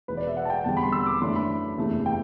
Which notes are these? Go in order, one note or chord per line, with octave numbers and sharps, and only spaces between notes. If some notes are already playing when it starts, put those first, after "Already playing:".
E1 E2 B2 B4
D5
E5
F#5
A5
G5
E1 E2 D3 G3 C4 A5
B5
C6
E6
D6
F#2 E3 A3 D4 C6
B5
F#1 E2 C3 E3 A3
G5